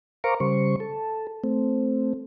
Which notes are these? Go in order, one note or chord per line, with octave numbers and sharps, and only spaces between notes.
A#4 C5 F5 A#5 C#6 D6
C#3 G3 C5 C#6
A4
A3 C4